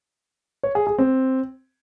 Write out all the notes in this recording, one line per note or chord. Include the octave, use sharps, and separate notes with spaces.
C#5
G#4
G#4
C4